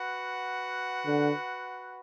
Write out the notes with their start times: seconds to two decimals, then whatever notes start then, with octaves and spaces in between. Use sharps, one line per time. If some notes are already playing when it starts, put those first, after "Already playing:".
Already playing: F#4 B4 F#5
1.06 D3